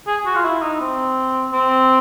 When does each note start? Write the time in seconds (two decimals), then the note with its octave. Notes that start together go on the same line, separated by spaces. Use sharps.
0.07 G#4
0.26 F#4
0.35 F4
0.45 E4
0.62 D#4
0.81 C4
1.53 C4